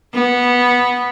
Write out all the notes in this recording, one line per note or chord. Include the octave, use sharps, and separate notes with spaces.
B3